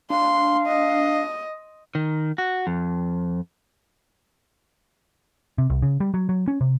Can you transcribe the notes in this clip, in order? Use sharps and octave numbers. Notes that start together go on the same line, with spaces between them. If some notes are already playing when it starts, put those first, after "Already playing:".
D4 F5 C6
D#5
D#3
F#4
F2
C3
C2
C#3
G3
F#3
F#3
C#4
C3